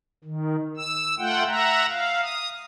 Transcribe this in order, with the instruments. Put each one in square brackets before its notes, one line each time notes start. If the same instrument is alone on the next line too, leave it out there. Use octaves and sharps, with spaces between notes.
[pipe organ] D#3
E6
A3 F4 F#5 G5
E5 F#5 A#5
F5
D#6